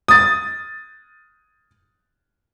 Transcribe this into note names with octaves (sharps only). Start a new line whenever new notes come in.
D#6 A6